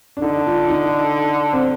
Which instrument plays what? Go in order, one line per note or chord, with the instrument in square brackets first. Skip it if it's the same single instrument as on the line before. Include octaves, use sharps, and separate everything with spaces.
[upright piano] D4
[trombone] D3 [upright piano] D#4
[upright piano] F4
D#4
C4